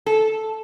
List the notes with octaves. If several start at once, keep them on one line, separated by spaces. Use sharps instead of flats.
A4